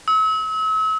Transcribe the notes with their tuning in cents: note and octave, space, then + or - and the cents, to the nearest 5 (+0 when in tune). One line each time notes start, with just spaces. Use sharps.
E6 -40